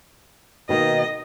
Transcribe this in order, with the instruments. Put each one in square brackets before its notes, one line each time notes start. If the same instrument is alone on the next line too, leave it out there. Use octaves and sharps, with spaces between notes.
[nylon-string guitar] B2 D#3 A#3 [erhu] D#5